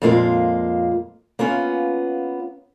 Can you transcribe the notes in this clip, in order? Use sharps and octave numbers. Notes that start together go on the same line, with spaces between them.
F2 A#2 G#3 A#3 F4
A#3 B3 C#4 F4